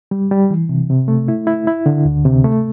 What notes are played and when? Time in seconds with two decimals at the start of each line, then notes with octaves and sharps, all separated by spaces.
0.11 G3
0.31 G3
0.50 E3
0.69 C3
0.90 C3
1.08 A3
1.28 E4
1.47 E4
1.67 E4
1.86 D3
2.05 D2
2.25 C3
2.45 A3